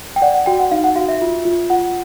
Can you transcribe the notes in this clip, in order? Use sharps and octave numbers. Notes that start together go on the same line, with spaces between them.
G5
D5 F#5
F#5
F#4 G5
F#5
D#4 F5
F#5
F#4 F5
E5
F4
F4
F4 F#5